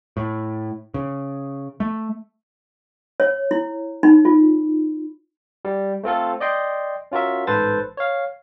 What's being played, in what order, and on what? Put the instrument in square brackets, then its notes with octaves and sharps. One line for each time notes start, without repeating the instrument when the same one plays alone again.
[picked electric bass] A2
C#3
A3
[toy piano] C#5
E4
D#4
F4
[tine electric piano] G3
A3 C4 F4 A4
D5 D#5 G5 C6
C#4 F4 F#4 A#4 E5
A1 G#2 A4 B4 C5 A6
C#5 F5